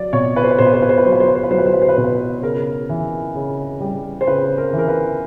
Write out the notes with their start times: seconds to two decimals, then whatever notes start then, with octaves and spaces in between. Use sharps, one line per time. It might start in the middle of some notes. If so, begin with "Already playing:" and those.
Already playing: F#3 D5
0.13 B2 C#5
0.36 B4
0.43 C5
0.51 B4
0.58 B2 C5
0.66 B4
0.74 C5
0.82 B4
0.89 C5
0.98 B4
1.05 F#3 C5
1.12 B4
1.20 C5
1.28 B4
1.35 C5
1.43 B4
1.51 F#3 C5
1.58 B4
1.66 C5
1.73 B4
1.82 C5
1.89 B4
1.97 B2 C5
2.04 B4
2.42 C#3 A#4
2.89 E3
3.35 C#3
3.80 G3
4.21 C5
4.27 C#3 B4
4.58 A#4
4.73 E3
4.79 A#4
4.88 B4